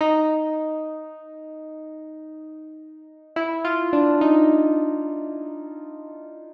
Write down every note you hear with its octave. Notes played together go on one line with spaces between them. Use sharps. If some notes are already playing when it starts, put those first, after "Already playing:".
D#4
E4
F4
D4
D#4